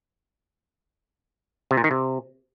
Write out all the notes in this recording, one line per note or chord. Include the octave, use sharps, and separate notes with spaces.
C3
A#2
D#3
C3